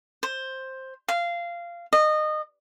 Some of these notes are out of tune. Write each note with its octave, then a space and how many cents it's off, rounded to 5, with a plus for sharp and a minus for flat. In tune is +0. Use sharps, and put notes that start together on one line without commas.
C5 +10
F5 -15
D#5 -25